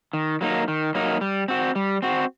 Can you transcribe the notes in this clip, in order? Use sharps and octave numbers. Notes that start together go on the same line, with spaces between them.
D#3
F#3 A#3 D#4
D#3
F#3 A#3 D#4
G3
C4 F#4
G3
C4 F#4